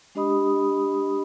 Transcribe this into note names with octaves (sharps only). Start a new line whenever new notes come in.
G#3 D4 G4 D#5 B5 D#6